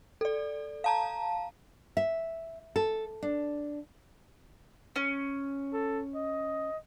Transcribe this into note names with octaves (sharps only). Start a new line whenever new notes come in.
A4 D5
F5 A5 A#5
E5
A4
D4
C#4
A4
D#5